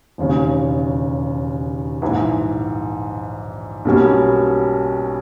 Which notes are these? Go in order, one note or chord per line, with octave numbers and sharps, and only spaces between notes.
E1 D#2 C#3
A#1 G#2 E3
B1 B2 G3 A#3 C#4